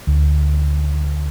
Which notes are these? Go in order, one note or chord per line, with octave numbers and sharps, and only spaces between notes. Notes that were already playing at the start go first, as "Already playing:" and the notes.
D2